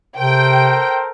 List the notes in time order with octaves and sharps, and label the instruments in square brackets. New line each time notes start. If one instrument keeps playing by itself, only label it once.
[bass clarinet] C3 [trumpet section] A4 A#4 C5 [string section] G5